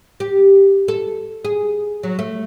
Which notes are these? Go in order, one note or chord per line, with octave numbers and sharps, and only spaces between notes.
G4
A4
G#4
F#3
A3